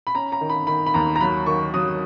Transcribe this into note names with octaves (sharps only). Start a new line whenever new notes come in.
B5
C#4 A#5
A#5
D#3
B5
D#3 B5
B5
D#2 A#5
A#5
F#3 B5
D#3 C#6
F#3 D#6